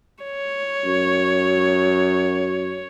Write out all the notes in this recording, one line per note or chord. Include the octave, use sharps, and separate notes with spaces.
C#5
F#2